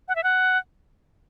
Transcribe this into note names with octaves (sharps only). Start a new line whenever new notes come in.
F#5
E5
F#5